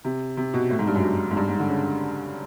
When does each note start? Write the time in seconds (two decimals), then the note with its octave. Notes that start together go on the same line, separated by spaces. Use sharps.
0.05 C3
0.37 C3
0.54 B2
0.70 A2
0.79 G#2
0.87 G2
0.95 F#2
1.04 G2
1.31 G#2
1.37 G2
1.48 G#2
1.59 D3
1.70 C#3